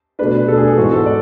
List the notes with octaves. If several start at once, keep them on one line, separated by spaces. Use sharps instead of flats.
B2 A3 D4 B4
B2 A3 D4 A4
G#4
G#4
G#2 E3 B3 F#4
A4
D5